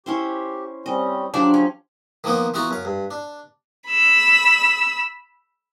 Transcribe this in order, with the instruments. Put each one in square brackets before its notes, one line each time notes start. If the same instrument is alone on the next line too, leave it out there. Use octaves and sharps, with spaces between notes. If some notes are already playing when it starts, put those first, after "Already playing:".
[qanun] C#4 E4 C5 [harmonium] G4
[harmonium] G3 C4 C#4 [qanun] D#5
[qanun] F3 G4 [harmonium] F#3 [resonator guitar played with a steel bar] D4
[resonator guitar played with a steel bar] C#4
[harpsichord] D#3 F3 A#3 B3 C5
E3 B3 F4 F#4 A#5
F#2 F5
G2
D4
[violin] B5 E6